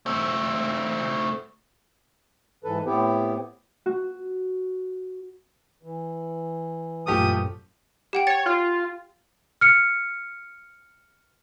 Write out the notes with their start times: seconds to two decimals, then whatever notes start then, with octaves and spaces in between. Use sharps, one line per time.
0.06 A3 C4
2.64 G#2 E3 A4 B4
2.86 A2 B3 C4 E4 G4
3.86 F#4
5.83 E3
7.07 A#1 F#2 F3 A3 G4 D#6
8.13 G4 F#5 G5
8.27 C#5 A6
8.46 F4
9.61 F6 C#7